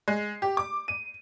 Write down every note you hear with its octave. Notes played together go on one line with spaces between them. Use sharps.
G#3
G4
D6
D#7